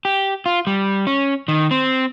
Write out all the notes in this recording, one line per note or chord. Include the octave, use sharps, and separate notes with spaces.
G4
F4
G3
C#4
D#3
C4